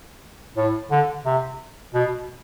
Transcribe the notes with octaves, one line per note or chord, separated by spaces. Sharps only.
A2
D3
C3
B2